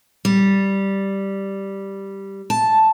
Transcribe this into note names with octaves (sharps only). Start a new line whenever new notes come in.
G3
A5